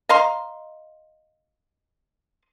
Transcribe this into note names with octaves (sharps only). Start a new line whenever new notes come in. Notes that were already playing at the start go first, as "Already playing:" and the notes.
D#5 F5 A#5 C6